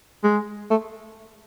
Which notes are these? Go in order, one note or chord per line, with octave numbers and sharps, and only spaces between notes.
G#3
A3